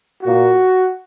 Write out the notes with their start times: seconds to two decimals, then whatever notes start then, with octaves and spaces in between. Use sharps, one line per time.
0.23 A#2 A#3 F#4